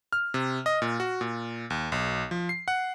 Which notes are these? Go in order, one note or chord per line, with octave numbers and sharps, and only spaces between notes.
F6
C3
D#5
A#2
F#4
A#2
D#2
B1
F3
C7
F#5